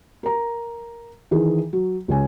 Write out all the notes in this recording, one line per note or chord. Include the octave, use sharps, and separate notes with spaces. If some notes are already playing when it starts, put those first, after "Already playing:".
A#4 A#5
D#3 E3 G#4
F#3
C#2 C#3 G#5